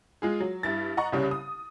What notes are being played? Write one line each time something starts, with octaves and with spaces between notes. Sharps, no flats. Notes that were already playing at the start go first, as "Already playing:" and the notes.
G#3 F4 G#4
F#3
G2 E4 A6
D#5 F#5 A#5 C#6
C2 C#3 G3 C#4
D#6